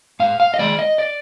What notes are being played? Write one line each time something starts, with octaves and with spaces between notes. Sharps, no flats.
G#2 F5
F5
D#5
D#3 G#3 D5
D#5
D5